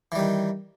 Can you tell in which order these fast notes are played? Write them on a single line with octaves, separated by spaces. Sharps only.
E3 G3 D#3